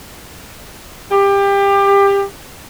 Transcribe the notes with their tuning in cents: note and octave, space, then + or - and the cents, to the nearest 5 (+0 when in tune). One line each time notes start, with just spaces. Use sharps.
G4 +25